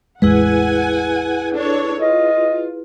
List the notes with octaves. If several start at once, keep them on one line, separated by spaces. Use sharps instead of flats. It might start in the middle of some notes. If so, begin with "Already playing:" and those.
A1 E2 G#3 E4 G#4 B4 F#5 G#5
D4 A4 C#5
F4 D#5